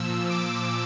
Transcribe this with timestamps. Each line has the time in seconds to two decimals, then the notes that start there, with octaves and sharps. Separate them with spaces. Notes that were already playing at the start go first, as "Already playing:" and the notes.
Already playing: A#2 F3 E6
0.30 D6